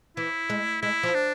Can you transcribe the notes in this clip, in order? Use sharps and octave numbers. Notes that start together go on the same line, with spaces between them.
E3 E4
G#3
G#3 E4
F3
D4